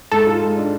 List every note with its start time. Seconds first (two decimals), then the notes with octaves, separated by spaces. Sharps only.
0.11 G#2 A4
0.27 F4
0.42 G#3
0.57 D4